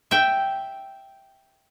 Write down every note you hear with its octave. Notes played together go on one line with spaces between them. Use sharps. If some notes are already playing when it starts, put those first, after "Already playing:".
E5 G5